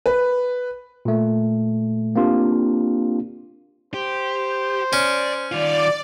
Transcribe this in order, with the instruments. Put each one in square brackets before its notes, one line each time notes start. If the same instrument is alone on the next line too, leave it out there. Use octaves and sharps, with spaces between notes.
[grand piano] B4
[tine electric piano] A#2 A3
A#3 C4 D4 F4 G4
[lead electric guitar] G4 [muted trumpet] C5
[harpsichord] C#4 [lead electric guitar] D5
[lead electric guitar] D#3 F4 [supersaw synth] D5